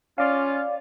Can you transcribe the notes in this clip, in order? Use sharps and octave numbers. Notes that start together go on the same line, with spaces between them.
C#4 F4 D5 F5